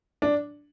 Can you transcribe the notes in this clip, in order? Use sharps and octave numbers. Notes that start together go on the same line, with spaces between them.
D4